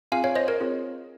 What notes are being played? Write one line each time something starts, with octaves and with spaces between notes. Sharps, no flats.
C4 F4 G#4 F5 G#5
C#5 F5
C5 D#5
A#4 C#5
C4 F4 G#4